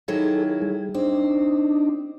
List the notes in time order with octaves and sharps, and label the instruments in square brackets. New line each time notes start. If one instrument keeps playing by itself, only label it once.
[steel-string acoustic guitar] D#3 F#3 E4 [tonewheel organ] G#4 A4
[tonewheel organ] G3 G#4
[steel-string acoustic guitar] C4 [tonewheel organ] D4 D#4